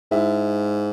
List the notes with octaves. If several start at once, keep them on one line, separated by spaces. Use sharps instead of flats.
G#2 E4 E5